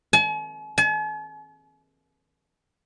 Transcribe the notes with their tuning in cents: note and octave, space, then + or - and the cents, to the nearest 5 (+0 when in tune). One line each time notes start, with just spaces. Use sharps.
G#5 +45
G#5 +45